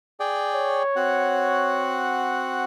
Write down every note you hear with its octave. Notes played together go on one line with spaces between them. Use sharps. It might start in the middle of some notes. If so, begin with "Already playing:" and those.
G#4 D5 G5
C#5
C4 F#4 F#5